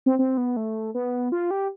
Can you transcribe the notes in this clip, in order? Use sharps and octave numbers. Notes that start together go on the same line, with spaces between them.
C4
C4
B3
A3
B3
F4
G4